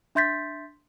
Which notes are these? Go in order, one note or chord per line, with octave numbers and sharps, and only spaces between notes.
D4 E5 C6 G6 A6 B6